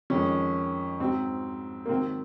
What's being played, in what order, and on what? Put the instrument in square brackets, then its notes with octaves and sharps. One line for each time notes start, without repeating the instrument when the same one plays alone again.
[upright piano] F2 D#3 G#3 C#4
G#2 F#3 C4
A#3
G#2 D#3 F#3 C4